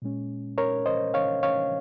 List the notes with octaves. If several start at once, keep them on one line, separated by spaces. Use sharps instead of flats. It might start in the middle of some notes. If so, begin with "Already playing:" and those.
A#2 G#3 C#4
A#4 C#5
C5 D#5
C#5 F5
C#5 F5